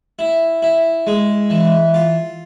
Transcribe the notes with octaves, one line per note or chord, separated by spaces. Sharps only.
E4
E4
G#3
E3
F4